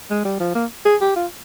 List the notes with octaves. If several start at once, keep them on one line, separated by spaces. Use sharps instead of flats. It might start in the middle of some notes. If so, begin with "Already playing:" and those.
G#3
G3
F3
A#3
G#4
G4
F4